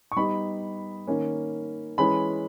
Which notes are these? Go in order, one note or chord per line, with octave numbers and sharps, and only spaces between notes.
C#6
G3 B3 D#4 B5
D#3 A#3 C#4
E3 G#3 C#4 B5